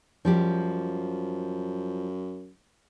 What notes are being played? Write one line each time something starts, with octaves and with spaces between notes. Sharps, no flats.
F#2 F3 G3 G4